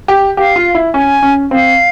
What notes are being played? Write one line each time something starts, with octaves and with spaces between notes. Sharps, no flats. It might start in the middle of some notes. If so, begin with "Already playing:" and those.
G4
G4 F5
F4
E4
C#4 G#5
C#4
C4 F5